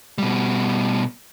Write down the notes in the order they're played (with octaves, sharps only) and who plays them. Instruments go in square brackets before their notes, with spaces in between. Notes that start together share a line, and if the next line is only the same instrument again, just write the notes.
[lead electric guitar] B2 G3